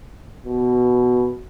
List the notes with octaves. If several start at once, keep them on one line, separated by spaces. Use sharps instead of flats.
B2